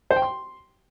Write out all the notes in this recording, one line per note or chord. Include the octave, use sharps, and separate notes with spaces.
C5
G5
C6